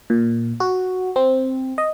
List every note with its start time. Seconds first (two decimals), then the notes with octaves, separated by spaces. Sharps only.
0.10 A#2
0.60 F#4
1.16 C4
1.78 D#5